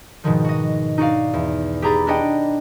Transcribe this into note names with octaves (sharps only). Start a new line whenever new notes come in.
G#2 B2 D#3 F3
F#4 D#5
D#4 F#4 D5 F5
E2
G4 G#4 A#5 B5 A6
D4 G4 D5 D#5 F#5 G5